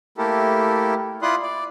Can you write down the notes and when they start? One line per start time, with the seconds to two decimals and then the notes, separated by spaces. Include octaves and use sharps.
0.18 A3 A#3 E4 G4 A4 A#4
1.22 E4 F4 D5 C6 D#6 F#6
1.42 D5